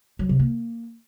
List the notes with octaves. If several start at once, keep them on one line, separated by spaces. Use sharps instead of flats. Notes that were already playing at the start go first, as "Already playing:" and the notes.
F#3
C3
A#3